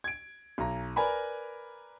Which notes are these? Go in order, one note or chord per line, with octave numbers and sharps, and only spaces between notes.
G#6 D7
B1 A#5
A#4 B4 D5 G#5 A#5 B5